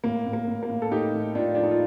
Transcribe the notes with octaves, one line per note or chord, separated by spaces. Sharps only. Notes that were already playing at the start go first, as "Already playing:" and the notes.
A2 A#3
A2
A#3
A2
A#3
A2
A4
A2 D#4 G4
A2
A2 D4 F4
F3 D4
D#4
F4